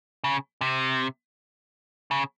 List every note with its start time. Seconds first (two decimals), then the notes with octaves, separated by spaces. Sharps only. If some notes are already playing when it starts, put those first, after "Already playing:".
0.24 C#3
0.61 C3
2.11 C#3